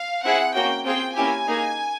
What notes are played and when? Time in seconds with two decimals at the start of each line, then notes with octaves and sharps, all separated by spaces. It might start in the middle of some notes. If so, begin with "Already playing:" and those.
Already playing: F5
0.23 C4 E4 G#4 F#5
0.54 A#3 C#4 F#4 G5
0.85 C4 F4 G#4 G5
1.16 A#3 C#4 E4 G4 G#5
1.47 A#3 D#4 G#4